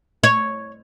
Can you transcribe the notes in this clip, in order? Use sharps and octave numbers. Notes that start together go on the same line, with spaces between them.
C#5